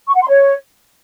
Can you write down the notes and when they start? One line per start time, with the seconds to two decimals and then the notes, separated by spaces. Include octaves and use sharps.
0.08 C#6
0.15 F#5
0.21 C6
0.28 C#5